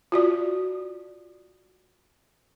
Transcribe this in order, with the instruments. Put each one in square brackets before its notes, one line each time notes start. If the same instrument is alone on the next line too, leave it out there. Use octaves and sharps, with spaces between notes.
[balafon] F4 F#4 D5